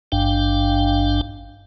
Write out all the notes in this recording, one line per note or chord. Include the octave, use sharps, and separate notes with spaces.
G#1 G2 D4 F5 G5